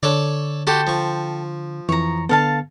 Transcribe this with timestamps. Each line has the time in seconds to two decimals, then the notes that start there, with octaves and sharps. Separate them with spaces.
0.03 D3 A4 C#5 D5
0.67 F#4 G4 A4 C5 G5
0.87 F3 C#6
1.89 F2 E3 C#5 A#5
2.29 D3 B3 A4 F5 A5